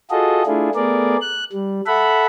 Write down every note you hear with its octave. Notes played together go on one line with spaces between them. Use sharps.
F4 F#4 G#4 A4 D#5
A3 D4 E4 F4 G#4
A3 B3 G#4 A#4 D5
F#6
G3
A4 E5 F#5 B5